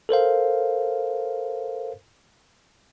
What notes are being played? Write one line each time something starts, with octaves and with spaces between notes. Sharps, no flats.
A4 A#4 C5 F5